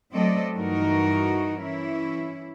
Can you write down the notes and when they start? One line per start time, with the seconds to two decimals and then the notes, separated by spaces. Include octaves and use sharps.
0.13 F#3 A3 C4 A4 D5 D#5
0.55 G2 E3 D#4 F#4 A#4
1.62 E3 C#4 E4